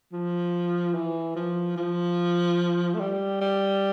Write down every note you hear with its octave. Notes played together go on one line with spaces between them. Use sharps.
F3
E3
F3
F3
A3
G3
G3